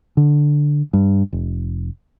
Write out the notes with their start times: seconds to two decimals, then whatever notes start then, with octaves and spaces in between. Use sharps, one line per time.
0.17 D3
0.93 G2
1.33 F1